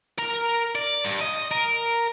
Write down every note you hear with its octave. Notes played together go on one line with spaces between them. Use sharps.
A#4 A#5
D5
G2
D#5
A#4